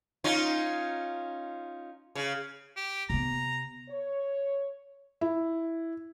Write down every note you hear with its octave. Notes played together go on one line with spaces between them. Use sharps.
C#4 D#4 F4
C#3
G4
C3 B3 A#5
C#5
E4